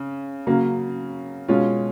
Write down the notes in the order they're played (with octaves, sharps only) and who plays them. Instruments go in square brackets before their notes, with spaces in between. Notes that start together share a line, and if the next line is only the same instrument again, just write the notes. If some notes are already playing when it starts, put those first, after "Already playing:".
Already playing: [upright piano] C#3
C#3 F#3 A#3
B2 G#3 C#4 F4